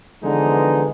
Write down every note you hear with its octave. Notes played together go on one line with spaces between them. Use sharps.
D3 E3 F3 G#3 B3 D#4